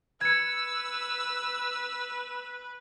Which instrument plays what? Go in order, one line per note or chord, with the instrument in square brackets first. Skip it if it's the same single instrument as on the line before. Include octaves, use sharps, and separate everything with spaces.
[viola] B4 [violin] E6 [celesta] G#6 C#7